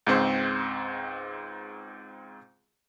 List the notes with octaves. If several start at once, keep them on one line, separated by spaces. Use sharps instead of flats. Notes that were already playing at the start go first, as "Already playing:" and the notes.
C#2 G#2 C4 C5